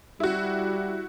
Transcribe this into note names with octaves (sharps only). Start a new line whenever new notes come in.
G3 E4 F#4